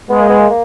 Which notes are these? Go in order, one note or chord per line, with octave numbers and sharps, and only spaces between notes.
G#3 B3
A#3
B3
A#3
A#3